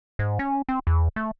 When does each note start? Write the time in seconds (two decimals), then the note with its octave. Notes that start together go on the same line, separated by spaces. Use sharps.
0.19 G#2
0.39 C#4
0.69 C4
0.87 E2
1.16 A3